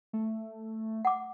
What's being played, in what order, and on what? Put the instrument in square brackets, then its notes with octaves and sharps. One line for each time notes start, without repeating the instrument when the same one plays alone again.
[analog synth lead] A3
[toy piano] F#5 D6